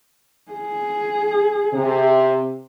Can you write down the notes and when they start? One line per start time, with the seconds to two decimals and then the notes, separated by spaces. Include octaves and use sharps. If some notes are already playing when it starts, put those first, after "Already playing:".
0.52 G#4
1.74 C3